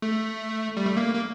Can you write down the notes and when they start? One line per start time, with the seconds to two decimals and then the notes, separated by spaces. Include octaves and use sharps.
0.02 A3
0.77 G3
0.86 A3
0.97 A#3
1.15 A#3